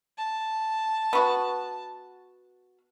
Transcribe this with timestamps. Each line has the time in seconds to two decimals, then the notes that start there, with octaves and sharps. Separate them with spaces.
0.18 A5
1.13 B3 F#4